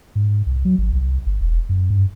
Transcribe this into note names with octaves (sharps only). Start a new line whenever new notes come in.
G#2
C2
F#3
G#1
C2
G1
E1
F#2
G2